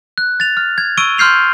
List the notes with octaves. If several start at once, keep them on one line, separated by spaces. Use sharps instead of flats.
F#6
A6 F7
F6
G#6
C#6 E6 D7 D#7 G7
C6 F6 G6 C7 F7